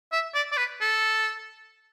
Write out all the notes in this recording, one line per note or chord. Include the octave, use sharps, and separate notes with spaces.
E5
D5
D5
B4
A4